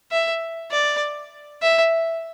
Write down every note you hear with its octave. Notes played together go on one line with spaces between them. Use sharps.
E5
D5
E5